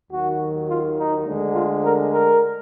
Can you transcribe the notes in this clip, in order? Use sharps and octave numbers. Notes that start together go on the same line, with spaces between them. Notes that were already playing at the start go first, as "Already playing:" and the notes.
D#2 D#3 F#3 F#4
F4
D#4
D2 D3 G#3
F4
A#4
A#4